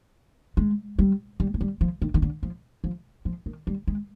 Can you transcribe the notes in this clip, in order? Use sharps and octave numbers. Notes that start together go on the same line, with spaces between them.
G#3
G3
G3
G#3
G3
F3
D#3
D#3
D3
F3
F3
F3
D#3
G3
G#3